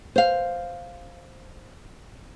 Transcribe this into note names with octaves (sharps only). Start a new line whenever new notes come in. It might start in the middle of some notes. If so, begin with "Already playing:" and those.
C5 F5